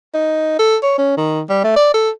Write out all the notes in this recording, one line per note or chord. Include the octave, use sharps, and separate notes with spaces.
D#4
A4
C#5
C#4
D#3
G3
A3
D5
A4